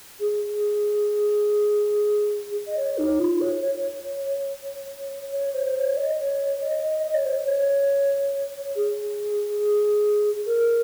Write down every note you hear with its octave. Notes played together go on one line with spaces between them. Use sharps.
G#4
D#5
C#5
D#4
F4
C#5
C#5
C#5
C5
C#5
D#5
C#5
D#5
D#5
C#5
C5
C#5
G#4
A#4